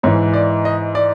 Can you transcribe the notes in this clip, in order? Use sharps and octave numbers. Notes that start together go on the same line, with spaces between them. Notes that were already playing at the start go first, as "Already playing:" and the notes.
G#2 E3 C#5
D5
D#5
D5